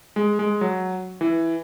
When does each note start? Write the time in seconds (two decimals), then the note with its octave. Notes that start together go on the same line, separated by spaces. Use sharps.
0.16 G#3
0.39 G#3
0.61 F#3
1.21 E3